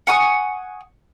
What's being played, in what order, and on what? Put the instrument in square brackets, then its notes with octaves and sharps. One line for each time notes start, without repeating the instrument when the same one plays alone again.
[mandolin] F#5 G#5 C#6 D#6